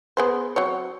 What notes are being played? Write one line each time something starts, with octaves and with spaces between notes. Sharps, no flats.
B3 G#4 C5
F#3 C4 C#5